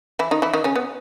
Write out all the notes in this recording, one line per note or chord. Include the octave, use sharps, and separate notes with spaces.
E3 E4
D#3 D#4
E3 E4
D#3 D#4
C#3 C#4
B3